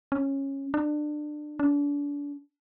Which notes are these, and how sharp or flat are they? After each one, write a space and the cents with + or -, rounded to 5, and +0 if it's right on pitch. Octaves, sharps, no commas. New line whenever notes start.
C#4 -15
D4 +25
D4 -35